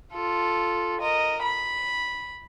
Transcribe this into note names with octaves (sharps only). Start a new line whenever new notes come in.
F4 A4
A#4 D#5
B5